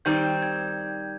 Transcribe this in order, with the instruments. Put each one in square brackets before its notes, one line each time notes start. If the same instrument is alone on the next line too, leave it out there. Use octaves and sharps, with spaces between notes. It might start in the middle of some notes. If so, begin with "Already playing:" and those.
[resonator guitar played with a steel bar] D#3 G3 C4 [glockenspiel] G6
[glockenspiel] G#6